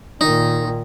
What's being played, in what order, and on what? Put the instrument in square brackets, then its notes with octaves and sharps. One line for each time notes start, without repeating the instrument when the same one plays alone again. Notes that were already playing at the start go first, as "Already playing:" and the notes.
[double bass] A#2 D#3 [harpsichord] D#4